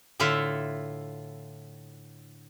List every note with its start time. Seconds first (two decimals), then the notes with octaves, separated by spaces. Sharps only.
0.19 A2 D3 E4 F4 E5 F#5